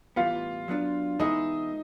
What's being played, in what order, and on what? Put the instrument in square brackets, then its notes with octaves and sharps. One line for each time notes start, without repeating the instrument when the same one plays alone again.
[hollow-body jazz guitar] A2 E3 G3 B3 [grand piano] F4 F5
[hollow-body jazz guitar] F#3 B3 D4 F4
[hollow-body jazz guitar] E3 G#3 B3 E4 G#4 [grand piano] D#4 D#5